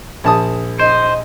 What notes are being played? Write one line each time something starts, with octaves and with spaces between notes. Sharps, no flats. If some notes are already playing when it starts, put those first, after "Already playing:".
A#1 A5 D#6
C5 D#5